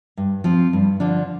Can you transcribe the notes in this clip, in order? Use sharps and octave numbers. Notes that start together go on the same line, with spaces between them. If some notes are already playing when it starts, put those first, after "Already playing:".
G2
F3 C4
G2
D3 F3 D4